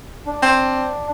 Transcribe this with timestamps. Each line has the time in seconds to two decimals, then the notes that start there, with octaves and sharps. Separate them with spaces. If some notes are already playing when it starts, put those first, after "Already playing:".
0.26 D4
0.42 C4